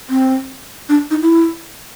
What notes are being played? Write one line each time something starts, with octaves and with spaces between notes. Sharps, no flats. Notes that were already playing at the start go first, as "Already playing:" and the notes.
C4
D4
D#4
E4